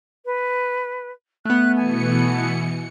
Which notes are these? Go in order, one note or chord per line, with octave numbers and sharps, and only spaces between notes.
B4
A3 B3 F#6
B2 E3 G#5 C#7